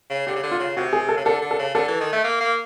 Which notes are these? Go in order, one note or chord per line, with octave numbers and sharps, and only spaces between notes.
C#3
D3 G4
C#3
D3
F4
C#3
C3 F#4
G#4
A4
C#3
D3 A4
D3
A4
C#3
D3 A4
E3
D#3
A3
A#3
A#3